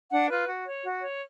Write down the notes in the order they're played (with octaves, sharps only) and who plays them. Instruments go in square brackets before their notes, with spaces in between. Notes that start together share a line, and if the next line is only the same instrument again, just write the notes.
[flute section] D4 F#5
F4 B4
F#4
C#5
F#4
C#5